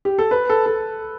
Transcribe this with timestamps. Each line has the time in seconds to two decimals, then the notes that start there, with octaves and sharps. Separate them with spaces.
0.05 G4
0.18 A4
0.31 B4
0.50 A4
0.66 A4